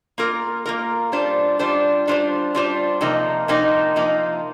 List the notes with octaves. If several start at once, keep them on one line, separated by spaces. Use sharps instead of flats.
A#3 F4 A#4
A#3 F4 A#4
G3 D4 F4 C5
G3 D4 F4 C5
G3 D4 F4 C5
G3 D4 F4 C5
C3 F3 A#3 D#4
C3 F3 A#3 D#4
C3 F3 A#3 D#4